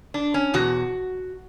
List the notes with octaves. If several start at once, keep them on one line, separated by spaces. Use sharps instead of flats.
D4
C#4
E2 B2 F#4